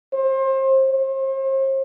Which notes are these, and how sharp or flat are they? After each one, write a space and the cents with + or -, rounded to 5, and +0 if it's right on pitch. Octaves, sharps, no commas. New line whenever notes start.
C5 +30
C5 +40